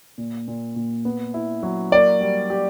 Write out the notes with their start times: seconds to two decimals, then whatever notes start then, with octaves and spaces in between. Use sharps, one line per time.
0.18 A#2
0.48 A#2
0.76 A#2
1.05 B3
1.34 E4
1.63 F#3
1.92 A#3 D5
2.21 G3
2.50 G4